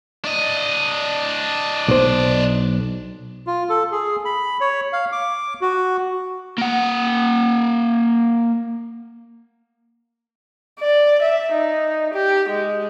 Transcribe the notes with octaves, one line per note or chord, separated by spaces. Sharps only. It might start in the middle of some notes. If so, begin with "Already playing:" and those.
D4 D#5
B1 C5
F4
A4
G#4
B5
C#5
F5
D6
F#4
A#3 F#5
D5
E5
D#4
G4
G#3